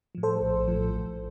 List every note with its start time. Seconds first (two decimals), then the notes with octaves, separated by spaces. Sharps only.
0.15 A2 F3
0.23 A4 C5
0.41 A#1
0.68 A2 F3
0.94 A1